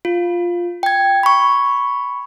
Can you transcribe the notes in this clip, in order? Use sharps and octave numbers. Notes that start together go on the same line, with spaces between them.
F4
G5 G#6
B5 C#6